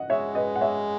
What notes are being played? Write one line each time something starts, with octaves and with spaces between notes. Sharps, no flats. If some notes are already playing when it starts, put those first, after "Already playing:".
Already playing: D#5 F#5
G#3 C#5 E5
B4 D#5
F#5
C#5 E5